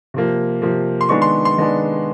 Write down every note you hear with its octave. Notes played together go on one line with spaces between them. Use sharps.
C3 F3 A#3
C3 F3 A#3
C6
D#3 G#3 B3 D4 C#6
C6
C6
D#3 G#3 B3 D4